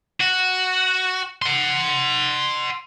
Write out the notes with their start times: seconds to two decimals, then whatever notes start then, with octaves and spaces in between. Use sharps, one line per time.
0.21 F#4
1.42 F#5 C6